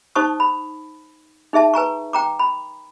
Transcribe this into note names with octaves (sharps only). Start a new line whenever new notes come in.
D#4 C5 A5 C#6 D#6
B5
D#4 G#4 E5 A5
B4 G#5 A#5 C#6
G5 A#5 D6
B5